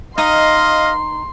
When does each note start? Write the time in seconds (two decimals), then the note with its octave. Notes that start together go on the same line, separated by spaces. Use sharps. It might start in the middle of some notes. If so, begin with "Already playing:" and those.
0.18 D#4 D#5 F5 C6 D#6